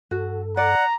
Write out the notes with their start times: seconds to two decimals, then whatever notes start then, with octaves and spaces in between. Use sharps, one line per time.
0.11 G2 F#4 A4
0.57 D5 F#5 A#5